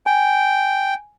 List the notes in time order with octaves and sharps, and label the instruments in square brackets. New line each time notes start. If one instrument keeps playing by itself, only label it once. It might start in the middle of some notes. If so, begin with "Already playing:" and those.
[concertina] G5 [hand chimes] G#5